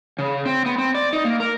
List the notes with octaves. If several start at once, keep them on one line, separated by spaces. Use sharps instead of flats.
C#3
C4
B3
C4
D5
D#4
A#3
A#4